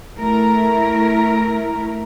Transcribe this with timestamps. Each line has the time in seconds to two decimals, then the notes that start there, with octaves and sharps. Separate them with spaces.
0.16 A3 E4 A#4